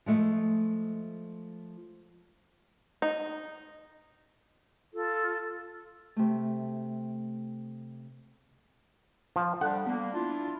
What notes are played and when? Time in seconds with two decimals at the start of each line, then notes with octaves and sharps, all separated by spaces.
0.06 F3 G#3 A3
3.02 D#4
4.93 F4 A4
6.16 C3 A3
9.36 F3
9.61 G3 D4 A4 F#5
9.86 G3 A#3 B3
10.14 D4 E4 F4